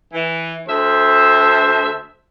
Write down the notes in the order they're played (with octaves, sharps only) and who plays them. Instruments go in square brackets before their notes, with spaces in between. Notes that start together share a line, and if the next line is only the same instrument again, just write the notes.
[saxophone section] E3
[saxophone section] D2 E5 [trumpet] C5